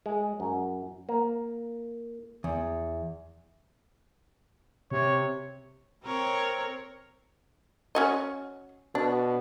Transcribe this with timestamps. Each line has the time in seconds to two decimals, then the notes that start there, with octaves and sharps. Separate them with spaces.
0.06 G#3
0.40 F#2
1.09 A#3
2.44 E2
4.91 C3 C#5
6.04 C4 A#4 C#5
7.95 C#4 F#4 D#5
8.95 B2 D4